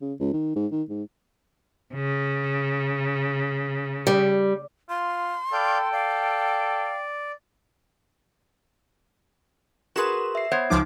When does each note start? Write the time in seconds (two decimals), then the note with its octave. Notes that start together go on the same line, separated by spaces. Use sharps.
0.01 C#3
0.19 C#2
0.33 D#3
0.56 G#2
0.72 D#3
0.89 G#2
1.94 C#3
4.07 G3
4.89 F4 C6
5.53 A4 D5 F5 G5 G6
5.92 D5 F5
9.96 F#4 G#4 A#4 B4 C6 E7
10.35 E5 C7
10.52 B3 C5 C#5
10.70 C#2 F3 D#4 D6